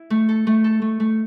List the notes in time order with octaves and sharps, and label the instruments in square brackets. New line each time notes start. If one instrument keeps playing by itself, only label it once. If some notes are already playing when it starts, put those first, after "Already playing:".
Already playing: [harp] E4
A3
A4
A3
A4
A3
A3